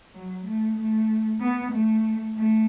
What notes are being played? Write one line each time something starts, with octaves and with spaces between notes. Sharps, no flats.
F#3
A3
A3
B3
A3
A3